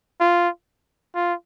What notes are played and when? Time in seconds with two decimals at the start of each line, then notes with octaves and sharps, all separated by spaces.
0.20 F4
1.15 F4